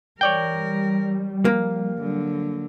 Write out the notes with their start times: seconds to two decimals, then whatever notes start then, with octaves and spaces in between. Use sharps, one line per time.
0.21 E3 G3 A#4 C#5 D5 G5
1.45 F3 A#3
2.00 D3 F#3